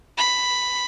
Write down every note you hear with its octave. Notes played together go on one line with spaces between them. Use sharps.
B5